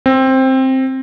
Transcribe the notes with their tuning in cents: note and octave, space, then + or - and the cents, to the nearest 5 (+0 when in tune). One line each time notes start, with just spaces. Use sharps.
C4 +10